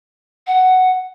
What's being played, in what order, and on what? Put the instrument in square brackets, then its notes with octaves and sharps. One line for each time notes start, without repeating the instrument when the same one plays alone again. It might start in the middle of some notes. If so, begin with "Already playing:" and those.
[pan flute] F#5